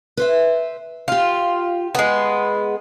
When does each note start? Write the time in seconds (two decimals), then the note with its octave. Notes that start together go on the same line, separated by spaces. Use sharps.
0.17 B4 C5 E5
1.08 F4 G4 F5
1.95 G#3 B3